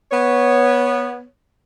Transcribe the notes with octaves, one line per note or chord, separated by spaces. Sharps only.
B3 C#5